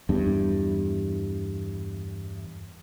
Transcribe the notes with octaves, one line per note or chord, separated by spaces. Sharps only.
E2 G2